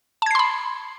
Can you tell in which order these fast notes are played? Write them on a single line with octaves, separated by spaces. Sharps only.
A5 G#6 C7 C6 B5